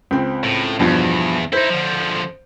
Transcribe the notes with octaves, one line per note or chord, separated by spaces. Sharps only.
C#2 C4
A2
E2 G2 B2 F3
D#4 E4 C5
D3 F3